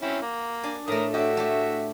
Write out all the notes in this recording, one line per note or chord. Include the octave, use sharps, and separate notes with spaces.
C4 C#4 E4 F#4
A#3
D4 G#5
A2 A3 A#4 D#6
D4 F#4 G4 E5
A3 G4